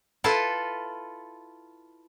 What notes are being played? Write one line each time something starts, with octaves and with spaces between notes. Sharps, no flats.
E4 F4 A4 B4